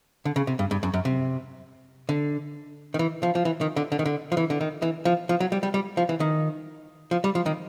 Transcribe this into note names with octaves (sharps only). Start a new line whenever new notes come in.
D3
C#3
C3
G2
G2
F#2
F#2
C3
D3
D#3
E3
F3
F3
E3
D#3
D3
D3
D#3
D3
F3
E3
D3
D#3
E3
F3
F3
F#3
G3
G3
G3
F3
E3
D#3
F3
G3
F3
D#3